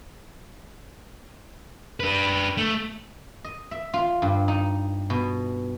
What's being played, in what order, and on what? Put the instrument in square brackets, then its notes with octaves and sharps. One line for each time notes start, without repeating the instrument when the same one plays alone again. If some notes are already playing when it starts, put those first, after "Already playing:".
[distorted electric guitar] D4 B4
A3
[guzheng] D#5
E5
F4
G2
D#4
B2